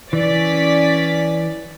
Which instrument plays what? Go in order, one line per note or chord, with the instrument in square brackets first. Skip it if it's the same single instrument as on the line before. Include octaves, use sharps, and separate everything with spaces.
[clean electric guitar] E3 [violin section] C#4 D5 B6